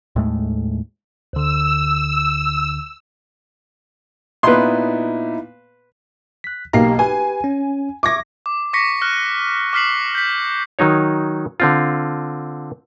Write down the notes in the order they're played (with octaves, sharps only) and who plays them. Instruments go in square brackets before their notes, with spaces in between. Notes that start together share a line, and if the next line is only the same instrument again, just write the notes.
[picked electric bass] D#2 A2 G#3 A3
[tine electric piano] D2 D3 [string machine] E6
[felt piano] A#2 B3 [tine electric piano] D#4 E4 [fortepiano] B4 C6
[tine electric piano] F#6 B6
[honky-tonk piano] B1 A#3 C7 [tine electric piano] G4 F5 A#5
[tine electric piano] G4 B4 [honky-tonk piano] G#5
[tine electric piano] C#4
[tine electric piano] E5 C#6 G#6 [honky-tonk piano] D6 A#6
[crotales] D6
C#6 D6 A#6 B6 C#7
F6 F#6
D6 F6 B6 C7 F#7
G6 B6
[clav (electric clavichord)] D#3 F#3 D#4 C#5
D3 C4 F4